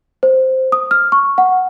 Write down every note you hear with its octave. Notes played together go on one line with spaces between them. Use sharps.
C5
D#6
F6
C#6
F#5